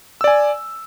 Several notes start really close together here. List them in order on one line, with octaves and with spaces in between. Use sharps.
E6 D5 G#5